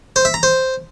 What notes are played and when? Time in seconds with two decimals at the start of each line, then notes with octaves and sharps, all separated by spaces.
0.16 C5
0.25 E5
0.34 A#5
0.43 C5